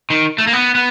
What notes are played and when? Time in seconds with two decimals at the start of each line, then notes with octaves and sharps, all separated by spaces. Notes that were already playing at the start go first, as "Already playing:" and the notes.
0.10 D#3
0.38 A3
0.47 A#3
0.53 B3
0.75 B3